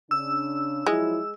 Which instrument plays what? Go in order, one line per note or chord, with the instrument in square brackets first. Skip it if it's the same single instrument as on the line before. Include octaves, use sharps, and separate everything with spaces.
[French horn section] C#3 D4 [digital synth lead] E6
[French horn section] F3 F#3 E4 [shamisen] G#3